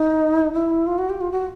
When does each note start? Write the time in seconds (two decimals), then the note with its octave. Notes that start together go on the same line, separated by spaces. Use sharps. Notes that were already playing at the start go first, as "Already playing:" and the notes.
Already playing: D#4
0.53 E4
0.87 F4
0.98 F#4
1.10 G4
1.21 F4
1.32 F#4